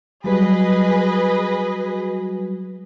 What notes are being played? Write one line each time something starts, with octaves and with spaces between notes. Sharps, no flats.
F#3 G3 F#4 G#4 B4 D#5